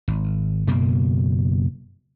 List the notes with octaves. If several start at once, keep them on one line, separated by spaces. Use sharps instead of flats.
G#1
F#1 F#2 B2 A#3